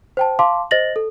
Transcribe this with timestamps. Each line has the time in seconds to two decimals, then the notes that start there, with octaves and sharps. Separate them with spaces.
0.17 C5 G5 A5
0.39 F5 A5 C6 D6
0.71 C5 D#5 A6 A#6 F#7
0.96 A4